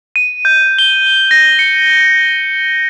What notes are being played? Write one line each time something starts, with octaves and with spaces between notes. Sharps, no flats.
D#7
G6
G7
A#6
C#7